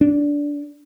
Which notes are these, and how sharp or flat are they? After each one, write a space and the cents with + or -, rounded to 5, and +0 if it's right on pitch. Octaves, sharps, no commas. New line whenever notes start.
D4 -15